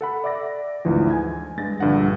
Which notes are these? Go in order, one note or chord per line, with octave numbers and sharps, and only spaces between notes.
A4 F#5 B5
D5 E5 D6 A6 A#6
D2 G#2 E3 F3
G#5 G#6
G2 G#3 A6 A#6
A#1 G2 D3 F#5